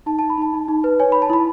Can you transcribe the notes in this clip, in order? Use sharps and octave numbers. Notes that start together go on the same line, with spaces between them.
D#4 A5
A5
D#4
B5
D#4 A5
D#4
D#4
B4
C#5 G#5
C#5 B5
A5
E4 B5